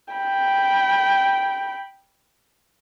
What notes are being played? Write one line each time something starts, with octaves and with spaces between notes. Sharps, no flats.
G5 B5